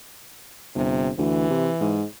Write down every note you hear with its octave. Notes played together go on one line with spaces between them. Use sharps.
G1 C3
D2 E3
C3
G#2